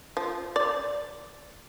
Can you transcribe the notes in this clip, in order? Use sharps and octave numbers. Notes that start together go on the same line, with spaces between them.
F3
D5